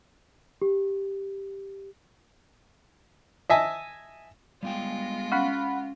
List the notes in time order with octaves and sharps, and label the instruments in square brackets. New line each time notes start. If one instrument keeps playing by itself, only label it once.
[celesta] G4
[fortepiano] D#5 E5 G#5 A5
[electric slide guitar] G3 B3 G5 [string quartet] G#3 F4
[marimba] C#4 [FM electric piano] F5 F#5 B5